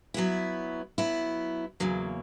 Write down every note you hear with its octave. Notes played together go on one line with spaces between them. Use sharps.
F#3 B3 E4
F#3 B3 E4
E2 C#3 F#3 A#3